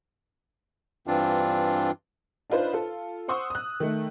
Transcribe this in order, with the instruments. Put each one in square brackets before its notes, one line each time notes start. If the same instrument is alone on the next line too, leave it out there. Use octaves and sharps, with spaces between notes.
[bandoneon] G2 E3 C4 D4 F4
[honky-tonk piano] D4 D#4 F4 B4 C5
F4 A4
C5 F#5 C6 C#6 D#6 E6
D#6 F#6
D#3 A3